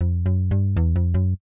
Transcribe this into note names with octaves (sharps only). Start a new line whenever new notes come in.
F2
F#2
G2
E2
F2
F#2